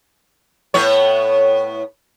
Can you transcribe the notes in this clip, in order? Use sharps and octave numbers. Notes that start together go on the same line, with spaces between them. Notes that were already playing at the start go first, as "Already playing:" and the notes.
A2 B3 C#5